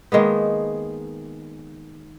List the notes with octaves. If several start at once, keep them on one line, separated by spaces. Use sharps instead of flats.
D#3 G#3 A#3 B3